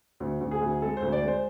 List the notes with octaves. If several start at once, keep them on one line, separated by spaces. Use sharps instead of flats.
D2
D2
G#4
D2
G#3 A4
C5
D2
D5
G#3 C5